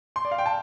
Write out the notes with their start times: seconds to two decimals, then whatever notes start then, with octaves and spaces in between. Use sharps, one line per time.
0.16 C6
0.25 D5
0.31 F5
0.38 G5
0.46 A5